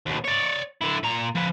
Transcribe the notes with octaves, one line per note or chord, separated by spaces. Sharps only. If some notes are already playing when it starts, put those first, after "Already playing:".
D#2 B2
C#5 D5
D3 E4
A#2 A#5
F3 B4